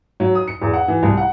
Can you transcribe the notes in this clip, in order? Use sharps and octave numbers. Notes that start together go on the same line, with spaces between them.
F#3
D#6
C#7
E2
F#5
E3
C2
F#5